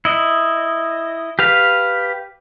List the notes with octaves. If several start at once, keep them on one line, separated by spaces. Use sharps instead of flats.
E4 D#5
G4 B4 F5